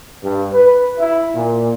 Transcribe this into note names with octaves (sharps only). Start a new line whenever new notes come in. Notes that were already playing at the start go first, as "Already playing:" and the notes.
G2
B4
E4
A#2